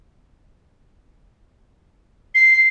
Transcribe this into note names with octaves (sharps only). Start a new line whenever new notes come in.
C7